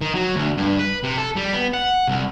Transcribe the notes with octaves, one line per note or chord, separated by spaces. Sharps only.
D#3
F#3
D2
G2
B4
C3
A4
G3
B3
F#5
C2